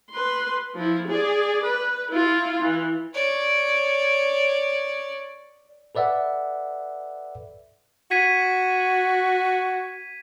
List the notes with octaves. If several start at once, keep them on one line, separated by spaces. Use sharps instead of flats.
B4 C6
F3 E4
G#4 D5
B4
E4 F4
E3
C#5 D5
A4 B4 D5 E5 F#5
F#4 G#6 B6 D#7